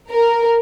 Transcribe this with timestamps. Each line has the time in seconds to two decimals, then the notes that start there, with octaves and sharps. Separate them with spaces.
0.11 A#4